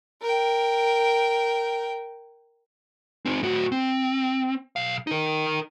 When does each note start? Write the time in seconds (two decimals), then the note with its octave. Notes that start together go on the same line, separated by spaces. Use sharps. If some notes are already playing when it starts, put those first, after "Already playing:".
0.21 A#4 G5
3.25 C4 D#4
3.43 A2 F#4
3.72 C4
4.76 B1 F5
5.07 D#4 A#4